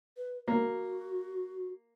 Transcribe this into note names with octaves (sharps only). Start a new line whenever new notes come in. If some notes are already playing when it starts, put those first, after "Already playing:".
B4
A#3 F#4